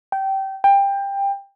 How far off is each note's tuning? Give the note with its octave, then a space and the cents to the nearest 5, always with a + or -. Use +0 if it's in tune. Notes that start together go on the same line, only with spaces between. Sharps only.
G5 -20
G5 +20